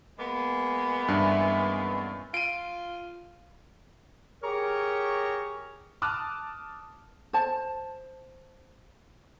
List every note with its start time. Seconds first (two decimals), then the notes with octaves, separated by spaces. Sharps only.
0.18 G#3 A#3 B3
1.08 G2 E3 C#4 C6
2.34 F4 D7 D#7
4.43 G4 G#4 A#4 C#5 A#5 C#6
6.02 A5 D6 D#6 F6 F#6
7.33 C5 A5